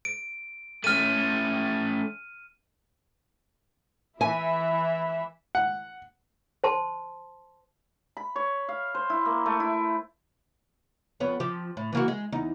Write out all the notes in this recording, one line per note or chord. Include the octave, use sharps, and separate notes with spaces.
D7
A3 C#4 F6 D#7
E3 E4 E5 G#5
F#5
C5 A5 C6
B5
C#5
F5
C5
E4
A#3
A3
E4
F2 B3 C#5
F3 G4
A2
E3 A#3 F#4
G#3
E2 D#4